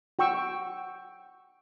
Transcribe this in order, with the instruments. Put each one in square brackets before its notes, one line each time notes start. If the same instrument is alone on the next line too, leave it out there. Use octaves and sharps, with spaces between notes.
[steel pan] F#4 G5 C#6 E6